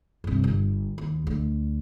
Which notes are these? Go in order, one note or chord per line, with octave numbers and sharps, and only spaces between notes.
G2 C3
G1
D#2
D2